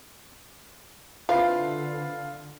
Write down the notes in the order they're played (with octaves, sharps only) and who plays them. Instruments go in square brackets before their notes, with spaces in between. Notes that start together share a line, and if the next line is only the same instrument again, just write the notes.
[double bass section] D3 [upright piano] C4 E4 B4 [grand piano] F4 [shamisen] F5